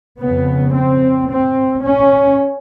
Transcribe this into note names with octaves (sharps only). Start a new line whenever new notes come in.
F2 C#3 B3
C4
C4
C#4